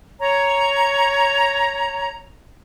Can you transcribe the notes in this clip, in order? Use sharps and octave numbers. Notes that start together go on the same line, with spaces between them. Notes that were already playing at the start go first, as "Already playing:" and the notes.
C#5 A#5